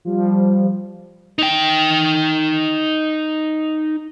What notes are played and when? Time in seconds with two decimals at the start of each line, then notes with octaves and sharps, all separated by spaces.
0.05 F3 G3
1.38 D#4 G5